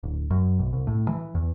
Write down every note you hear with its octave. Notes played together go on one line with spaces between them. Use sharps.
D1
F#2
B1
C2
A2
E3
E2